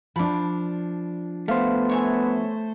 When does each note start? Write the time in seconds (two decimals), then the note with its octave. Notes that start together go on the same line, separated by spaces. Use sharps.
0.16 F3 D4 B5 D6
1.48 A3 B3 C5 F5
1.89 C#5 E5 G#5